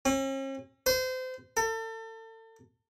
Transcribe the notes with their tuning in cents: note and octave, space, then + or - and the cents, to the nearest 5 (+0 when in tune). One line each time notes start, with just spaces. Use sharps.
C#4 -45
C5 -30
A4 +35